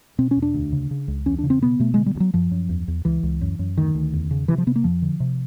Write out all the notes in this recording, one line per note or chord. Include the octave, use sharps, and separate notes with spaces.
B2 C4
C#4
E2
D4
D2
C#3
C#3
C#2
E2 C#4
D4
C#3
C4
B2 B3
B2 A3
D3 G#3
G3
D2
F#3
F#2 F3
F#2
E2
E2
C#2 E3
C#2
F#2
F#2
D2 D#3
D2
E2
C#3
C3 E3
F3
C3 B3
A#3
F2 F3
D3
C3